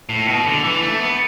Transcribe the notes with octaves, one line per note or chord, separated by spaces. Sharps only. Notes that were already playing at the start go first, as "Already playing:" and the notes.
A2
B2
D3
E3
A3
B3